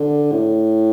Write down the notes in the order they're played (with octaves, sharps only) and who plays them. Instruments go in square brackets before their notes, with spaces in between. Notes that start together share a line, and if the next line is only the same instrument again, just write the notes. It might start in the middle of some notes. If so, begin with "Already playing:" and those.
Already playing: [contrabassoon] D3
A2